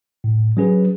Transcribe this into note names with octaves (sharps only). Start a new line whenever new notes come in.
A2
F#3 C#4 G#4 B4